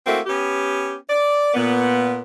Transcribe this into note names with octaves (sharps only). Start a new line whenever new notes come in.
A3 A#3 C4 E4 F#4
B3 C#4 G4
D5
A#2 B3